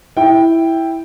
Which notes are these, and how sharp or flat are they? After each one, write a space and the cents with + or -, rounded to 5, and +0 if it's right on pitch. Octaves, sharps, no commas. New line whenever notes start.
E4 +0 G5 +0